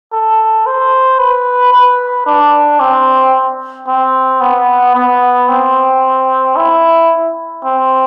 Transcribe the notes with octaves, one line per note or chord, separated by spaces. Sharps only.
A4
C5
B4
B4
D4
C4
C4
B3
B3
C4
E4
C4